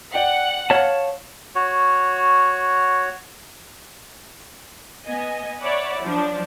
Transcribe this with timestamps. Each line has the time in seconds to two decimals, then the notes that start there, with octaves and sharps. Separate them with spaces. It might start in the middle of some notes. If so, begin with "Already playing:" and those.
0.14 D5 F#5 G5
0.70 C#5 F5 A5
1.55 F#4 C#5
5.06 B3 D#5 G#5
5.60 C#5 D5 E5 F#5 B5
6.02 F3 F#3 D4